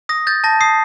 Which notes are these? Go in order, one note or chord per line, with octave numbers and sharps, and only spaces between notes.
D#6 A#6
G6 A6
A5 A#6
D#6 C7